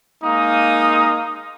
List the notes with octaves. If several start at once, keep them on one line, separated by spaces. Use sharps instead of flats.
G#3 A#3 D#4 F5 D#6